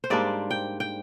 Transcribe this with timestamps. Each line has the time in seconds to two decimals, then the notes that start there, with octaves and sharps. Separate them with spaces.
0.04 C5
0.10 G#2 G3 A#3 D4 D5
0.51 G5
0.80 G5